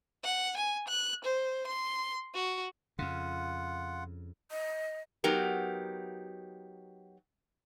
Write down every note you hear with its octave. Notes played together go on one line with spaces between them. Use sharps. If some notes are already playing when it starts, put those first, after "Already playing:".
F#5
G#5
F#6
C5
C6
F#4
F2 C#3 F4 F#5
D#5
F#3 B3 D#4 G4 A#4